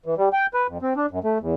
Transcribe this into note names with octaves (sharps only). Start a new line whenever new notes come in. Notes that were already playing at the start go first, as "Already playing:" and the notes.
E3
G3
G5
B4
F2
C4
D4
F#2
A3
E2